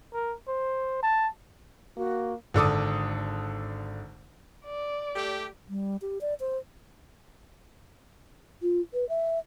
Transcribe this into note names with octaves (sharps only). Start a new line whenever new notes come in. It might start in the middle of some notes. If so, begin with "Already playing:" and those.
A#4
C5
A5
A#3 F#4
G#1 D3 A4 D6 D#6
D5
A3 G4
G3
G4
D5
C5
F4
B4
E5